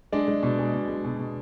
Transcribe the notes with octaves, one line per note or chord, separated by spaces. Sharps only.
G#3 D4 D5
G#3
B2
G#3
B2
G#3
B2
B2